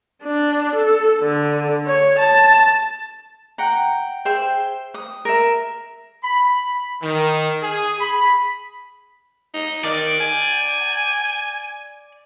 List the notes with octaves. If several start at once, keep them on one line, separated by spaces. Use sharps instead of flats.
D4
A4
D3
C#5
A5
F#5 G5 A#5
G#4 C5 E5 G5
D#6
A#4 E5
B5
D#3
G#4
B5
D#4
D#3 D5
G#5